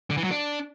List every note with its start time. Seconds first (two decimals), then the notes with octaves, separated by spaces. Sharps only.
0.10 D3
0.17 E3
0.24 F#3
0.31 D4